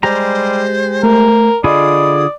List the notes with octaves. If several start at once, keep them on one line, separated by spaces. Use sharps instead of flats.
G3 G#3 G4 C5 A#5
A3 A#4
D3 F4 G#4 D5 D#5 B5 D#6